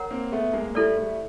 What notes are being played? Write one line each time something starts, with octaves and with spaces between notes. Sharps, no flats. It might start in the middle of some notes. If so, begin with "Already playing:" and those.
Already playing: A#4 C#5 F#5 A#5
A#3 C4
A3 B3
G#3 A#3
A#3
G3 A3 E4 A4 D5
G3 A3